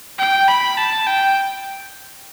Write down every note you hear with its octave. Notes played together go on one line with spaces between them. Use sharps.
G5
B5
A5
G5